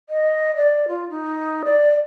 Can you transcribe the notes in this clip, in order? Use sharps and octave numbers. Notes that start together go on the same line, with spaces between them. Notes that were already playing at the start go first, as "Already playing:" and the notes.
D#5
D5
F4
D#4
D5